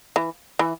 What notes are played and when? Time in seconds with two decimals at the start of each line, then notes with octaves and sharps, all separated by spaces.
0.16 E3
0.59 E3